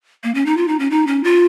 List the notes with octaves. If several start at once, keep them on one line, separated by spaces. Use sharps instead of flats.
A#3
C#4
D#4
F4
D#4
C#4
D#4
C#4
F4